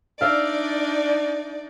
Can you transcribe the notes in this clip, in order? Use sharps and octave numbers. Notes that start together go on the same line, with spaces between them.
D4 D#4 D5 E5 F5